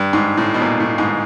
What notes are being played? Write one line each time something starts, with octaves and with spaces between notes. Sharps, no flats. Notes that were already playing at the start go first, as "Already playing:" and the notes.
Already playing: G2
G#2
A2
B2
A#2
A2
G#2